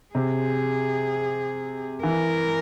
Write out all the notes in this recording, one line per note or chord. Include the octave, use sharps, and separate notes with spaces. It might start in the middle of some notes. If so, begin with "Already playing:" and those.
C3 G#4
E3 A#4